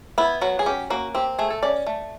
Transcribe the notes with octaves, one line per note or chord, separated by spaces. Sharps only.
B3 E4
F#3 F#4
G#4
C#4 G4
A#3 F#4
C4 G4
A3 G#4
A4
C#4 D5
A3